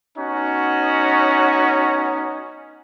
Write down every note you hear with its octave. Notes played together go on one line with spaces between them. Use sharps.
B3 C#4 D#4 F#4